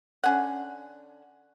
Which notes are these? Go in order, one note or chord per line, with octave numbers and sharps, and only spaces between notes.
D3 C#4 F#5